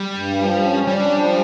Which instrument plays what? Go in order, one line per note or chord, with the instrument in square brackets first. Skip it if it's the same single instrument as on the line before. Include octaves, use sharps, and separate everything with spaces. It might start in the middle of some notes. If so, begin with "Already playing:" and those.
Already playing: [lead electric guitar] G3
[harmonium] G2
F3
C#4
[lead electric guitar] G3 [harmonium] D4
[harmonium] F3